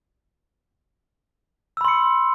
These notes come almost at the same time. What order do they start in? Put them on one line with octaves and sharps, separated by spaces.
E6 B5 C6 C#7